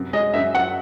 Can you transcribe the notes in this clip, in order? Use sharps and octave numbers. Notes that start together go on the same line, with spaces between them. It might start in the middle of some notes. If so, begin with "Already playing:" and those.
Already playing: F#2 C3
G#3 D#5
F#2 E5
F#2 F#5